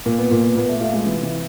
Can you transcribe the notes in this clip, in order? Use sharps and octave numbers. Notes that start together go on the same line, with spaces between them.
A#2 A#3
B3
A#2 A#3
B3
A#2 B3
A3
A3 F4
G#3
C3 E3
E3